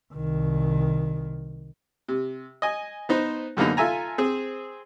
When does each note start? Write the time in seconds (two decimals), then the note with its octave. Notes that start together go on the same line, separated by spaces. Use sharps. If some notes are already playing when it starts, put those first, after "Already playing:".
0.14 C2 D#3
2.08 C3
2.62 D#5 G#5
3.09 B3 D#4 C5
3.57 F#2 D3 A#3 B3 D#4
3.77 F4 A4 E5 G#5 A#5
4.18 C4 G#4 C5